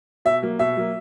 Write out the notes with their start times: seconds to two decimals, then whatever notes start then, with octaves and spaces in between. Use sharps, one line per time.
0.25 B2 E5
0.42 F#3 A#3
0.59 B2 E5
0.77 F#3 A#3